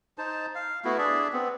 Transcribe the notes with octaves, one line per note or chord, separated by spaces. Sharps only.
D#4 C5 A5
F5
A3 B3 E4 F#4
D4 G#4 D5 E5
B3 C4